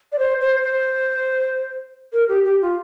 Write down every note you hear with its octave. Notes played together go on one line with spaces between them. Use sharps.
D5
C5
C5
C5
A#4
G4
G4
F4